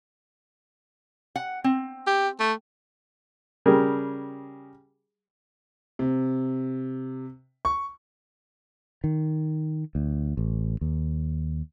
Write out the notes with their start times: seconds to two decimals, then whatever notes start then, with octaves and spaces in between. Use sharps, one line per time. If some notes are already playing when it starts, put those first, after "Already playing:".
1.36 F#5
1.64 C4
2.07 G4
2.40 A3
3.66 C#3 G3 G#4 A#4
5.99 C3
7.65 C#6
9.04 D#3
9.95 D2
10.37 A1
10.81 D#2